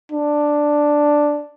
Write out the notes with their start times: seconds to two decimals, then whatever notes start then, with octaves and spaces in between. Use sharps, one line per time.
0.12 D4